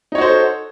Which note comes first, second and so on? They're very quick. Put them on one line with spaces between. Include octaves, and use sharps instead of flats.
D#4 C#5 F#4 C5 A4